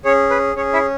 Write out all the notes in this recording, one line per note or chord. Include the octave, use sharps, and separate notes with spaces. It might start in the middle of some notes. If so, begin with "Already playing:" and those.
C#4 G#4 C#5
B4
C#4 G#4 C#5
E4 E5